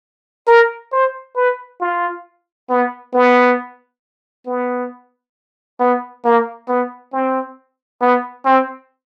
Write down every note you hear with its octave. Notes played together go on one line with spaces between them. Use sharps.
A#4
C5
B4
F4
B3
B3
B3
B3
A#3
B3
C4
B3
C4